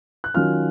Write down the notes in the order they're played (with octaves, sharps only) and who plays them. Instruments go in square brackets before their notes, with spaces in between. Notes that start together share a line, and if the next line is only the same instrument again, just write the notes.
[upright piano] F#6
D#3 F#3 C#4 F4 F5 F6